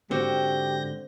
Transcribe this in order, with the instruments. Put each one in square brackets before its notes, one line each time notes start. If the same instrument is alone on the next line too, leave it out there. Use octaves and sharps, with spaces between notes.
[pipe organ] G#2 G6 A#6 [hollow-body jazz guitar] D3 F#4 [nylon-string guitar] C4 [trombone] G4